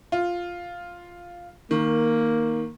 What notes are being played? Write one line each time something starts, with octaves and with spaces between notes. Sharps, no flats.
F4
D#3 A#3